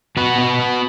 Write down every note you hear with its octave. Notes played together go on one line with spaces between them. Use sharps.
B2 F#4 B4
B2
B3